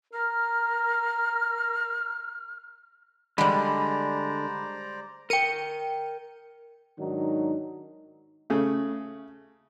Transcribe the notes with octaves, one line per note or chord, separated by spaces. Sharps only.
A#4 F6
D3 G3 G#3 C5 D5 A#5 B5
A#4 G5 C#7 D#7
G#2 D#3 F#3 D4 D#4
C#3 A3